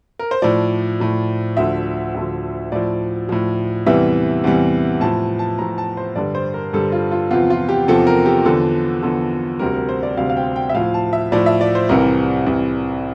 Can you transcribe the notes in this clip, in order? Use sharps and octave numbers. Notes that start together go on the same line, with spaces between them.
A#4
C5
A2 F3 D5
A2 F3
D2 D3 F3 E5
D2 D3 F3
A2 F3 D5
A2 F3
E2 C3 E3 G3 E5
E2 C3 E3 G3
A2 F3 A5
A5
A2 F3 A#5
A5
C5
G2 D3 G3 D5
C5
A#4
G2 D3 G3 A4
F4
F4
E2 C3 F3 F4
F4
G4
E2 C3 F3 A4
A#4
G4
E2 D3 F3 A4
E2 D3 F3
D2 C3 G3 A#4
A#4
C5
D5
D2 C3 G3 F5
F5
G5
G5
E5
A2 F3 F5
A5
E5
A2 F3 D5
E5
D5
C5
C2 C3 E3 A#4
C2 C3 E3